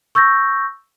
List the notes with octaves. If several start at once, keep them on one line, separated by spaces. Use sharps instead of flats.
C#6 E6 G6 A6 A#6